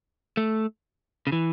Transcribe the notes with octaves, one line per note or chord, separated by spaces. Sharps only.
A3
C#3
E3